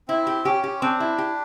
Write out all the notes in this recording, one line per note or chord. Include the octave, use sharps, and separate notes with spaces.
C4 E4
G4
C#4 G4
G4
C4 D4
E4
G4